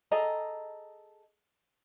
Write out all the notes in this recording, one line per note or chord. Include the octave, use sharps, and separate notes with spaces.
G#4 A4 D#5 A#5